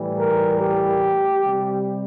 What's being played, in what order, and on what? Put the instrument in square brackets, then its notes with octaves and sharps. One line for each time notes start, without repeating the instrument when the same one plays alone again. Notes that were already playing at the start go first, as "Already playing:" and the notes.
Already playing: [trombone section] A2 E3 G3
A#4
G4
C3 G3